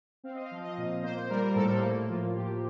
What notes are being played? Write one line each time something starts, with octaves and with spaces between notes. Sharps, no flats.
C4 F5
D#5
F5
F3
D#5
A#2
A#3 C5
G3 A#4
A2 A4
A#3
F3 F4
A2 G4